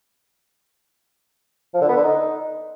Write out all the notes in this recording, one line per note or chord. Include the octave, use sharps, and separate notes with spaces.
F3
D3
B3
D3
D#4